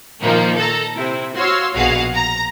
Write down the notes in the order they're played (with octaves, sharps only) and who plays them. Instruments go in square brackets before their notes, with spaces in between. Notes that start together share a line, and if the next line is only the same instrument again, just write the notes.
[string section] A#2 D#3 F3 A#3
A4 A#5
C3 C4 E4
F#4 C#5 F5 C6 E6
A#1 B2 F#4 G#4 F5 F#5
A#5